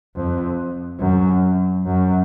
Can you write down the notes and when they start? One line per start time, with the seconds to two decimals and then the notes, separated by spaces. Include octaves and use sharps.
0.16 F2
1.00 F#2
1.85 F#2